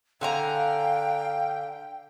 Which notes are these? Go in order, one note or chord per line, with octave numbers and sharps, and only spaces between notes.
D3 F5 G5 G#5 A#5